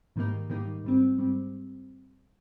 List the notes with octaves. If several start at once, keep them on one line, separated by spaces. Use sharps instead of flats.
G#2 D#3 G3 A#3 D#4
G#2 D#3 G3 A#3 D#4
G#2 G3 C4
G#2 G3 C4